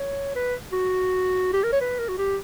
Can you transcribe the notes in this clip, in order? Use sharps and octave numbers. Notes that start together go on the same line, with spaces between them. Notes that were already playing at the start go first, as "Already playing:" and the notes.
Already playing: C#5
B4
F#4
G4
A#4
C#5
B4
A#4
F#4
G4